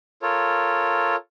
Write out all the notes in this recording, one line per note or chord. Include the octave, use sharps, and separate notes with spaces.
F4 A4 A#4 C#5